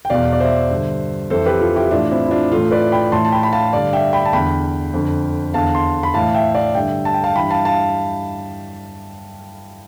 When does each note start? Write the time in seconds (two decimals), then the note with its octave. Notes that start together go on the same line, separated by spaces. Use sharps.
0.05 G5
0.10 E2 B2 D5 F5
0.33 D5
0.40 C5 E5
0.70 G2 D3
1.30 F2 E3 A4 C5
1.46 G4 B4
1.61 F4 A4
1.76 E4 G4
1.91 A2 E3 D4 F4
2.11 C4 E4
2.25 E4
2.31 D4 F4
2.52 A2 E3 F4 A4
2.71 B4 D5
2.92 G5 B5
3.12 A2 E3 A5 C6
3.25 A5
3.32 G5 B5
3.43 B5
3.52 F5 A5
3.73 G2 D3 D5 F5
3.93 E5 G5
4.13 G5 B5
4.25 A5
4.33 E2 D3 G5 B5
4.94 F2 D3
5.54 E2 D3 F5 A5
5.74 A5 C6
6.03 B5
6.14 A2 E3 F5 A5
6.34 E5 G5
6.55 D5 F5
6.75 G2 D3 E5 G5
7.05 A5
7.14 G5
7.24 F5 A5
7.35 G2 E3 G5 B5
7.50 F5 A5
7.65 F5 A5